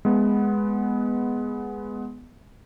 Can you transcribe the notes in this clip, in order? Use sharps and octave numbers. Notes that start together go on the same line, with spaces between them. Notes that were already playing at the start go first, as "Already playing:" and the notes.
G#3 B3